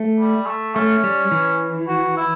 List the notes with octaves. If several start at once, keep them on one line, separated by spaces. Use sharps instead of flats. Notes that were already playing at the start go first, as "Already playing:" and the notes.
Already playing: A3
G3
A3
A3 C#4
G3
E3
F#4
E4